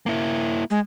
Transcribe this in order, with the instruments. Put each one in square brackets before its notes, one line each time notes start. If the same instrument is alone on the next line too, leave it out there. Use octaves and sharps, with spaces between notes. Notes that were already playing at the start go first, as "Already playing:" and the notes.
[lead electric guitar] A#3 E4
[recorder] G#3